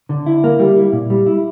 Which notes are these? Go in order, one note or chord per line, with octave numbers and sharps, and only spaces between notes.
D3
E4
A#3
G3
E4
A#2
G3
E4